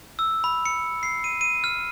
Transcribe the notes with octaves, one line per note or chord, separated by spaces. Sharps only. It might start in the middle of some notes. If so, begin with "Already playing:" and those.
E6
B5
C#7
C7
D#7
D#7
F6